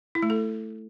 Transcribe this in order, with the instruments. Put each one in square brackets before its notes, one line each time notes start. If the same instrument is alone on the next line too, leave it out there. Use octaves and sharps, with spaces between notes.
[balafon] E4
A3
A4